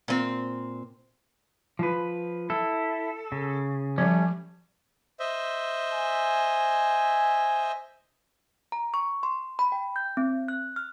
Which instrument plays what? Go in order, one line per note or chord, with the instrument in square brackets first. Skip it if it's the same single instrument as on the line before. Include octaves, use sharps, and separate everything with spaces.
[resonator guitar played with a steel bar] A#2 C4
[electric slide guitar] F3 B4
[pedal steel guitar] E4 [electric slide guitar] A4
[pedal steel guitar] C#3
[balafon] F3 [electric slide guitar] G3 A3 C#4
[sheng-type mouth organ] C5 D#5 E5
[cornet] G#5
[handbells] A#5
C#6
C6
B5
G5
G6
C4
F#6
F6